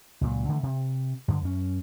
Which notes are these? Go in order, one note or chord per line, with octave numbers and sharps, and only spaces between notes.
C#2 A#2 F#3
D3 E3 A3
C3
G2 D3
F#2 C#4